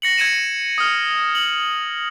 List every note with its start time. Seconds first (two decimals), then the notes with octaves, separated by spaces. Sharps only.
0.02 A#6 C#7 F#7
0.18 G#6 C#7 D#7 E7
0.78 D#6 F6
1.35 F#7